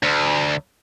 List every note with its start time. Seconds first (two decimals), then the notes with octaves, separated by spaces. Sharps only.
0.03 D2